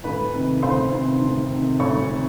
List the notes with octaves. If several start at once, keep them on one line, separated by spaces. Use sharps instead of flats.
D2 B4 B5
C3 D#3
D2 C5 C6
C3 D#3
D2
C3 D#3
D2 C#5 C#6
C3 D#3